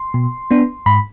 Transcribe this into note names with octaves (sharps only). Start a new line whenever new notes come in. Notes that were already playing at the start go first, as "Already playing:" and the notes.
Already playing: C6
B2
B3 D4
G#2 B5